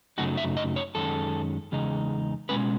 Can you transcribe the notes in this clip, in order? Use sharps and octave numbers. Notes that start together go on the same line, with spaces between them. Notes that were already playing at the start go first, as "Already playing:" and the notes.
F#2 C#3 F#3 A3 D#4 F#4
E5
D#5
C#5
F#2 D#3 G#3 C#4 A4
E2 C#3 G#3 D#4
B2 G#3 C#4 B4